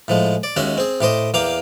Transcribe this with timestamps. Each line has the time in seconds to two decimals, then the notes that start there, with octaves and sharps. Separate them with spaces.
0.08 A2 F3 G#3
0.43 D5
0.57 D#2 G#3 C#4 F#4 E5
0.78 C4 G#4
1.01 A2 G4 C5 D#5
1.34 E2 A#3 G4 F5